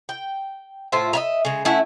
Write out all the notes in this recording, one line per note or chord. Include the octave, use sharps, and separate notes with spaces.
G5
A2 F4 C5 E5
D#5 E5 A#5
C#3 G#3
A3 C#4 E4 F#5